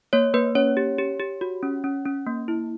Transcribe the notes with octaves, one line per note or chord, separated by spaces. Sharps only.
A#3 C#5
A#3 B4
C#4 C#5
G4
G4
G4
F#4
C#4
C#4
C#4
A#3
E4